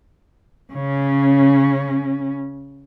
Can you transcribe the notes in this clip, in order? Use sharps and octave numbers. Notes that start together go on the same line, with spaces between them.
C#3 C#4